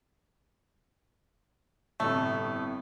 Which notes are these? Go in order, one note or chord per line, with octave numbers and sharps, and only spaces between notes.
G1 A2 C3 A3